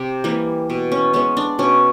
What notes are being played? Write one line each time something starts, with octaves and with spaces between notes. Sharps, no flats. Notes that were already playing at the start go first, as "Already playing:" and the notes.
Already playing: C3 G4
E3 G3 A#3
B2
C#4
G#3 B3 C#4
D4
B2 C#4